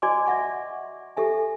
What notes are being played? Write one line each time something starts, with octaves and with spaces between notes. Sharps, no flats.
F#4 D5 D#5 G#5 C6 D6
D5 E5 F#5 C#6
G4 A4 E5 G#5